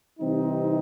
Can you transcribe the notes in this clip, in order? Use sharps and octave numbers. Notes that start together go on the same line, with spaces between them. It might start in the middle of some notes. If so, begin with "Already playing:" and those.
C3 E3 G3 C4 D#4